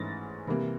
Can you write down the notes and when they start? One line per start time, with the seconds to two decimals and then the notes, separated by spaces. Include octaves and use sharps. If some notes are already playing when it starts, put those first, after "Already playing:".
Already playing: G#2 E3 A3 C#4 A6 A#6
0.47 C3 E3 G3 A#3